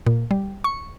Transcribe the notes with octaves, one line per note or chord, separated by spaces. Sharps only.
A#2
G3
C#6